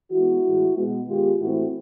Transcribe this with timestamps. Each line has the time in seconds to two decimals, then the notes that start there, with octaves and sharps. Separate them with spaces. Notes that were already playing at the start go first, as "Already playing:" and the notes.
0.12 E3 G#3 B3 E4 F#4
0.44 A2 E3 G#3
0.76 B2 G#3 B3
1.08 D#3 G#3 B3 F4 G4
1.40 A2 E3 A3 C4 E4 F#4